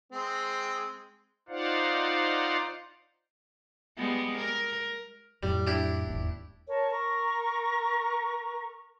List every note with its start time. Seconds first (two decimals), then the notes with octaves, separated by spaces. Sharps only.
0.12 G#3 C4
1.49 D#4 F4 C5 D5 F5 F#5
3.97 G3 G#3 B3
4.38 A#4
5.43 F2 A2 F#3 G3
5.67 D4 E4 G4
6.07 E1 D#2 G#2
6.69 A#4 C#5 A5
6.90 A#4 A#5 C#6